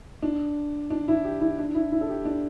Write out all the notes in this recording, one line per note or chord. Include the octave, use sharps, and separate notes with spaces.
D4
D4
E4
G4
E4
D4
E4
E4
A4
G4
D4